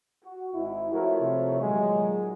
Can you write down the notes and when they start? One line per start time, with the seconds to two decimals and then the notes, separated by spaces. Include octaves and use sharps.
0.23 F#4
0.54 G#1 G#2 G#3 E4
0.92 F3 A3 E4 F#4 A#4 C#5
1.21 C3
1.61 A#2 D#3 F#3 G#3